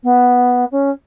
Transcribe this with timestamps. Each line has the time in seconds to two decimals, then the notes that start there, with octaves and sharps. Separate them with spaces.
0.03 B3
0.71 C#4